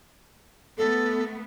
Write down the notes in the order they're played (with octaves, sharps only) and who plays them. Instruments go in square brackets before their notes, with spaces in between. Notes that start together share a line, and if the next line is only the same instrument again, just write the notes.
[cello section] A3 B3 [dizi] A4